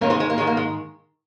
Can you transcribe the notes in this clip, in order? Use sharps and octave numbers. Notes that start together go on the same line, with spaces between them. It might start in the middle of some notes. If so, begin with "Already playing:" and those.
G#2 D#3 A#3 C#4
G#3 C4
G#3
A#3
G#2 D#3 G#3
A#3
G#3